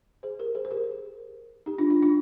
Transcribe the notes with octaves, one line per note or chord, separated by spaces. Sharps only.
G#4 C5
G4 A#4
G#4 C5
C5
G4 A#4
D#4 G4
D4 F4
D4 F4
D4 F4